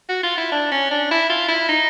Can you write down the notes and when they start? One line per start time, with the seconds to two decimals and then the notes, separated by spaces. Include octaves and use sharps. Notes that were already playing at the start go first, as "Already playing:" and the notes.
0.09 F#4
0.23 F4
0.38 E4
0.52 D4
0.72 C#4
0.91 D4
1.11 E4
1.30 F4
1.48 E4
1.69 D#4